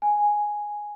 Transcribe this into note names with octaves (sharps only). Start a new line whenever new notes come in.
G#5